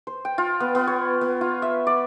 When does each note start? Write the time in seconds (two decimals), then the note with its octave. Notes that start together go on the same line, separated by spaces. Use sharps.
0.07 C5
0.25 G5
0.38 F4
0.60 B3
0.75 B3
0.87 C#5
1.21 B3
1.41 F4
1.62 E5
1.87 D5